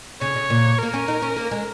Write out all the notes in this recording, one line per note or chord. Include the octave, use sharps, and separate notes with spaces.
C#3 C#5
C#3
A#2
A#3 A#4
C#4
D#4
C#4
A#3
G#3